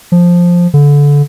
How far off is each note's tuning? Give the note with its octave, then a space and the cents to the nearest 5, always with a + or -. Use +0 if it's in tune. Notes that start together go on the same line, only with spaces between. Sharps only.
F3 +5
D3 -25